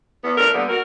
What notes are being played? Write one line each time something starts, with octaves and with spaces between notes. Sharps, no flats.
E2 B3
F3 A3 D4 A#4
A#2 D3 G3 B3
F#4 A#4